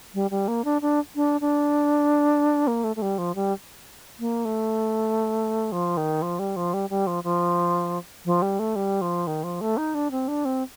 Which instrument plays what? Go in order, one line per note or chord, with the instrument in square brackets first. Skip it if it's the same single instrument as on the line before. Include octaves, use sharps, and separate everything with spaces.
[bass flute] G3
G3
A#3
D4
D4
D4
D4
A#3
A3
A3
G3
F3
G3
A#3
A3
F3
D#3
F3
G3
F3
G3
G3
F3
F3
F3
G3
A3
G3
F3
D#3
F3
A3
D#4
D4
C4
D4
C4